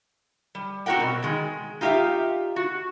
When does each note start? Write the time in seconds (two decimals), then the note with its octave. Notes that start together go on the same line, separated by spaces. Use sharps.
0.55 G3
0.86 C4 F#4 G4 A#4 F#5 G5
1.00 B2
1.22 D#3 G#3
1.81 D#4 F4 G4 C#5 E5 F5
2.56 F#4